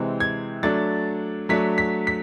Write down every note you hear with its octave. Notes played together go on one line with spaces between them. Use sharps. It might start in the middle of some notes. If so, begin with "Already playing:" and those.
Already playing: C3 E3 G#3 C4
G#6
F#3 A3 D4 A6
F#3 A3 D4 B6
B6
B6